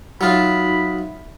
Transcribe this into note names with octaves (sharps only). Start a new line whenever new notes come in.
F#3 D#4 F4 F#4 E5 B5